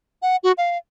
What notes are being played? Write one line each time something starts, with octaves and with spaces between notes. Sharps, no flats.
F#5
F#4
F5